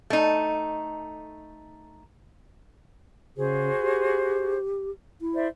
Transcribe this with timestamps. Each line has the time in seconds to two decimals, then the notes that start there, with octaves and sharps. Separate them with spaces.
0.10 A3 D#4
3.37 C#3 F#4 G#4 C5
3.82 G4
5.21 E4
5.34 C5 D5 E5